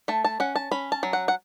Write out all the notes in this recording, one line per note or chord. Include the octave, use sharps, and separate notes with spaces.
A3 A5
A5
C#4 F#5
A5
C#4 B5
A5
F#3
F#5
F#5